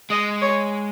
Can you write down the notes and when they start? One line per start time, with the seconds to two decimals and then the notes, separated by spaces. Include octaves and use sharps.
0.10 G#3 D#5
0.42 C#5